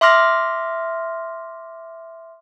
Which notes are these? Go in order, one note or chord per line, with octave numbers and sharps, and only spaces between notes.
E5 C6 D6 F6 A#6